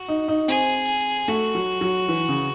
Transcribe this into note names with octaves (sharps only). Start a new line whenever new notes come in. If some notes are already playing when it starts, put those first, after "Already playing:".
Already playing: F#4
D#4
D#4
C4 G#4
A3 F#4
F#3
F#3
E3
C#3